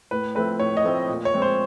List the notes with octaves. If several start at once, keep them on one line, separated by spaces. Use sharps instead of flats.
A2 B4
F3 A3 C4 B4
A2 C#5
D#5
F3 A3 C4
A#2
C#5
F3 G#3 C4
C5